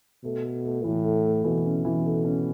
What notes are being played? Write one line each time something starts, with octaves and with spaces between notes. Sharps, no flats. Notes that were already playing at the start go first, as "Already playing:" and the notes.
B2 A3
A3
A3
A2 E3
A3
A3
B2 E3
C#4
E3
A3
C#4